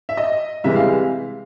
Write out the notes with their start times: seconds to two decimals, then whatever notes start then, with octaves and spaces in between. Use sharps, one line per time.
0.09 E5
0.17 D#5
0.64 C2 C3 E3 G#3 E5
0.75 F5